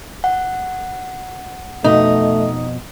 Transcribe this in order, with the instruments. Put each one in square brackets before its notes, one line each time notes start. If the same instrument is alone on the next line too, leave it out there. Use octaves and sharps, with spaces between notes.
[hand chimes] F#5
[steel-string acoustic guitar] F2 B2 [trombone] A3 [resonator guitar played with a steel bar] D#4